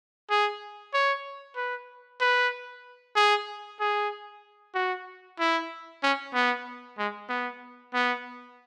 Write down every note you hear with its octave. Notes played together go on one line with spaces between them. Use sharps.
G#4
C#5
B4
B4
G#4
G#4
F#4
E4
C#4
B3
G#3
B3
B3